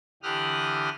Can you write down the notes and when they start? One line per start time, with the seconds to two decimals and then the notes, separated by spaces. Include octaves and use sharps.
0.23 D3 E3 G4 D#6 F6 F#6